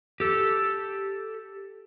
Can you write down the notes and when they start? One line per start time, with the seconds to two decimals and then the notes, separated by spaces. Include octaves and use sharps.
0.20 G4 A4